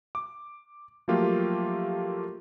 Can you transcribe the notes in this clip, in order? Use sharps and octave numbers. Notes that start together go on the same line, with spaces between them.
D6
F3 F#3 A3 A#3 F4 G4